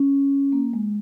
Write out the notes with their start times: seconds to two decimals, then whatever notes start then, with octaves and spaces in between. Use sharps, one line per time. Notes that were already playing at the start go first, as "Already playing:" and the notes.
Already playing: C#4
0.52 A#3
0.73 G#3